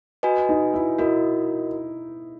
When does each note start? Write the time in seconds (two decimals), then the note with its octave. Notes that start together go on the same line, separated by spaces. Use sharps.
0.23 F#4 B4 D#5 G#5
0.49 D#4
0.74 E4
0.99 E4 F#4 A#4 D#5